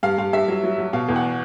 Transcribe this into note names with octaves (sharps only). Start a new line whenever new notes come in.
G2 F5
G2 F5
G2 E5
F#3
F#3
F#3
B2 F5
E2
F#5